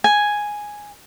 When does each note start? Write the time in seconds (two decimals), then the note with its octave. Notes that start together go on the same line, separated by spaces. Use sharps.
0.04 G#5